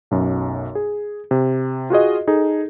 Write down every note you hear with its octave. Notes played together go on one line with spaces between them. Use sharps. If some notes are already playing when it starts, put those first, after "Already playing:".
B1 F#2
G#4
C3
F4 F#4 G#4 D#5
D#4 G#4 A4